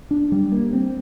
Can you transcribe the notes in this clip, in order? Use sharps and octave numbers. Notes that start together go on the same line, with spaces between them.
D4
G3
A#3
C4